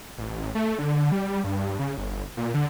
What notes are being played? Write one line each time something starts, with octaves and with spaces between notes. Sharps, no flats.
A1
A3
D3
G3
G2
C#3
G1
A#2
D3